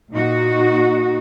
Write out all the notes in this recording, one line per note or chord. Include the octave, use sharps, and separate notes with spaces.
A#2 D#4 F#4